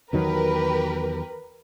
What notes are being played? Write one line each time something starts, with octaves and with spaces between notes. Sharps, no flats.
E2 D#3 F#3 G4 A#4 B4